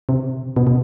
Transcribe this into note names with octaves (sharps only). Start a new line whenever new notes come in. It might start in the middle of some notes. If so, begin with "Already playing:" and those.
C3
B2
B2